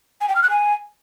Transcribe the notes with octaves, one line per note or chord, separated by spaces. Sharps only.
G#5
G5
F6
F#6
G#5